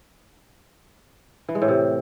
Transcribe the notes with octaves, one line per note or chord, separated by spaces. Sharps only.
E3
G#3
A2
C3